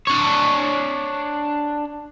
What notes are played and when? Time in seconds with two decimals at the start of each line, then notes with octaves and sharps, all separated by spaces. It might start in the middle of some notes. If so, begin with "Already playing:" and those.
0.07 D4 C#5